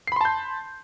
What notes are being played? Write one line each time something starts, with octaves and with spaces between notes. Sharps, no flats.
A5 B5 C6 G6 C7